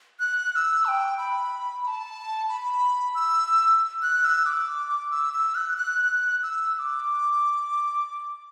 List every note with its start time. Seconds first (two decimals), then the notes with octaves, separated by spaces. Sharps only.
0.20 F#6
0.52 F#6
0.56 E6
0.85 A5
0.88 G5
1.18 B5
1.83 B5
1.87 A5
2.49 B5
3.15 E6
4.02 F#6
4.25 E6
4.46 D6
5.11 E6
5.33 E6
5.55 F#6
5.77 F#6
6.43 E6
6.75 E6
6.79 D6